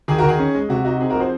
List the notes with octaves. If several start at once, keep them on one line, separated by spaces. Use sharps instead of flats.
D#3 G#4
F#4 A#4
D#3 G#4
C#4
G#3
C3 F#4
D#4 F#4
C4 G#4
F#4 A#4
F3 G#4 C5